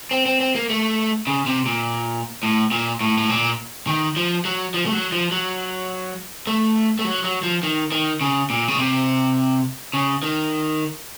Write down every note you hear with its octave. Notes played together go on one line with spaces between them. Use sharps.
C4
C4
C4
A#3
A3
C#3
C3
A#2
A2
A#2
A2
A2
A#2
D#3
F3
F#3
F3
A3
F#3
F3
F#3
A3
A3
F#3
F#3
F3
D#3
D#3
C#3
A#2
C#3
C3
C#3
D#3